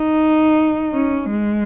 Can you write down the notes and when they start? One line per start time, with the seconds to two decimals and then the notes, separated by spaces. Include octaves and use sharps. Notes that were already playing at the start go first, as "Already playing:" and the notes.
Already playing: D#4
0.93 C#4
1.30 G#3